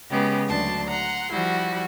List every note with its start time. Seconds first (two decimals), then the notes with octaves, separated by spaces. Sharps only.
0.11 C#3 G#3 B3 C#4 G4
0.48 D2 F#3 D4 A5 C6
0.89 F#5 A#5 C6
1.32 F3 G3 E4 F#4